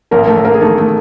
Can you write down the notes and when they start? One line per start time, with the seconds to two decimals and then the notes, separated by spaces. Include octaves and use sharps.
0.11 A1 A#3 A#4
0.27 A3 A4
0.37 A1
0.44 A#3 A#4
0.54 G#4
0.61 D#3 A3 A4
0.77 A3 A4